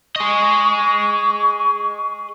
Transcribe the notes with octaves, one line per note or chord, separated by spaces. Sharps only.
G#4 D#5 C#6